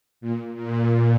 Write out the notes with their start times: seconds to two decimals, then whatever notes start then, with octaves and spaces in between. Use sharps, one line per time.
0.21 A#2
0.55 A#2